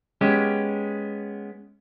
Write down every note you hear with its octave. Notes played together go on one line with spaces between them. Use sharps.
G#3 B3 C#4 G4